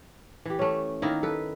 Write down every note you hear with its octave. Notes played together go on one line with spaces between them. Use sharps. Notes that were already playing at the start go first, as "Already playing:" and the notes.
E3 G4
A3 C#4
D#3 A#3 D#4 E4
A4 B4